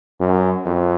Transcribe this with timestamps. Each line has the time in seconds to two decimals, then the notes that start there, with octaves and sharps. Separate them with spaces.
0.21 F#2
0.66 F2